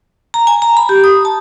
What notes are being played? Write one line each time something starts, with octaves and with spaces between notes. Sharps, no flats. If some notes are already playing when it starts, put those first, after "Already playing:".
A#5
G#5
A#5
B5
G4
D#6
A5